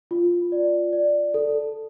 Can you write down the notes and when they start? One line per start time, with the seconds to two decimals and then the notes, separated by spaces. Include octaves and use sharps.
0.11 F4
0.52 D5
0.93 D5
1.34 A4